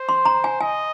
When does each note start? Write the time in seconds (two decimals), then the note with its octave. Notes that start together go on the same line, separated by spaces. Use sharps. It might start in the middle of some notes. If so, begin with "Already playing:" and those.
Already playing: C5
0.09 C6
0.25 A#5
0.44 G#5
0.61 D#5 G#5